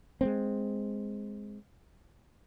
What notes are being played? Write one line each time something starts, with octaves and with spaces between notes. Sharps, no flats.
G#3 A#3 C4